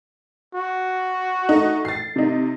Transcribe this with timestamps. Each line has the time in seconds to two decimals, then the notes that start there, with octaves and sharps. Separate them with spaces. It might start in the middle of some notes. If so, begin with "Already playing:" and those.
0.55 F#4
1.49 A3 D#4
1.85 A6 C7
2.16 C3 D#4